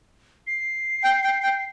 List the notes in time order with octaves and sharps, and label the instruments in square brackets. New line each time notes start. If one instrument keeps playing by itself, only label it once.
[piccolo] C7
[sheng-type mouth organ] G5
G5
G5